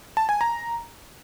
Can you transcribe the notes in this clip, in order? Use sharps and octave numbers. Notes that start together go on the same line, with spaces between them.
A5
G#5
A#5